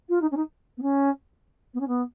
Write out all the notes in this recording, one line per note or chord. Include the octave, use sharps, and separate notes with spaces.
F4
D#4
C#4
D#4
B3
C#4
B3
C#4
B3